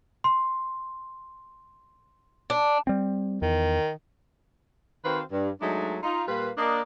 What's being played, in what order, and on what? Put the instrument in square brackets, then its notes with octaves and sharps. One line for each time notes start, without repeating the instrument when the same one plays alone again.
[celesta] C6
[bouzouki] D4
[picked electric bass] G3 C4
[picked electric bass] E2 [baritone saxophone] D#3
[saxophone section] D#3 C4 F#4 B4 C5 F5
G2
F#3 G#3 A3 D4 D#4
D#4 F4
A#2 G3 A#3 F4 B4
A#3 D4 D#5